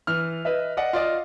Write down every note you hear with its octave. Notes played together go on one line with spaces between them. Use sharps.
E3 F6
B4 D#5 E5
D5 D#5 F#5
F4 D5 D#5 F5